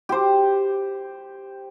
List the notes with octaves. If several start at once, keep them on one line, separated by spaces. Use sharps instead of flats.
G4 C5